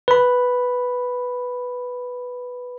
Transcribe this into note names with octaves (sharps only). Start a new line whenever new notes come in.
B4 B5